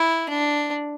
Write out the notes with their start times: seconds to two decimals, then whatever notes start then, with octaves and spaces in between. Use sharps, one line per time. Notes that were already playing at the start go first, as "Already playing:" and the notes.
Already playing: E4
0.29 D4